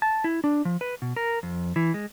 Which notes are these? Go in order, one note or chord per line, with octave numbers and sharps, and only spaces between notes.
A5
E4
D4
F3
B4
B2
A#4
F2
E3
G#3